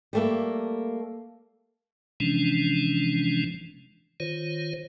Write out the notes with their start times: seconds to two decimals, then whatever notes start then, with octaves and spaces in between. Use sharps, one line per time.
0.13 G3 A3 A#3
2.20 C3 E3 F3 G#3 C#4 D4
4.20 D#3 F4 C5 C#5